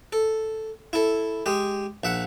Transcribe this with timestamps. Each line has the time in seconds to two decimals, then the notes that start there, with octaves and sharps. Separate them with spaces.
0.13 A4
0.93 E4 A4
1.46 G#3 G4
2.04 A#1 E5 F#5